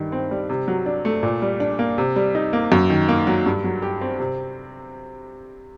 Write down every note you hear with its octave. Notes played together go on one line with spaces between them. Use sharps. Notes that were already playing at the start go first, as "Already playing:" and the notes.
Already playing: G2 D#3
C4
G3
C3
F#3
D4
A3
A#2
G3
D4
A#3
C3
G3
D#4
A#3
F#2
D#3
A#3
F#3
G2
F#3
G4
C4
C3